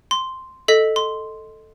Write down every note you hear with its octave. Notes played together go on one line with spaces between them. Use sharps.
C6
A4 D#5 B6
C6